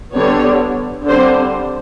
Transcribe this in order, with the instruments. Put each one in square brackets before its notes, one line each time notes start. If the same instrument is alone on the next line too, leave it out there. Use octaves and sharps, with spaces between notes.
[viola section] D3 G3 B3 D4 C#5
D3 G3 C4 C5